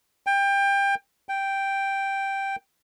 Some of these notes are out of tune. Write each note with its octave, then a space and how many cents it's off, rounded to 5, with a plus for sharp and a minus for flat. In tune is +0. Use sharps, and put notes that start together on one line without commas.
G5 +25
G5 +0